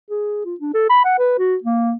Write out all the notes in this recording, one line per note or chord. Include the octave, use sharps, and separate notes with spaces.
G#4
F4
D4
A4
B5
F#5
B4
F#4
A#3